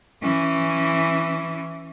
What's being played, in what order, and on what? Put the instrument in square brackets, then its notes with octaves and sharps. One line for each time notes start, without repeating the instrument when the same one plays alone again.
[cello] E3 C#4